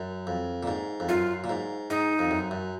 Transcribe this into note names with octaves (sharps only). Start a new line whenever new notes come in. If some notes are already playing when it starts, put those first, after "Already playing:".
Already playing: F#2
F2
A#2
G#2
F2
F#2 F4
A#2
G#2
G#2 D#4
F2
F#2
F#2